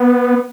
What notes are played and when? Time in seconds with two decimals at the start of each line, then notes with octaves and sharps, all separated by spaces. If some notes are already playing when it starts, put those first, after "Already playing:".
Already playing: B3